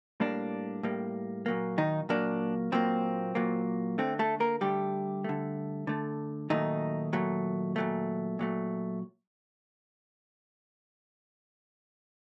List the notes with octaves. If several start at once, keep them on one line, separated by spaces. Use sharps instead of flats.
A2 G3 A#3 D4
A2 G3 A#3
A#2 F#3 A#3
D#3 D#4
A#2 F#3 A#3 D4
A#2 F#3 A#3 C4
A#2 F#3 A#3
D3 A3 C4
A3 A4
A#3 A#4
D3 G3 A3 G4
D3 A3
D3 A3
A#2 D#3 F#3 A3 D#4
A#2 F#3 A3
A#2 F#3 A3
A#2 F#3 A3